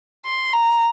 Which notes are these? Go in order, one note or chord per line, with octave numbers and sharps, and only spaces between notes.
C6
A#5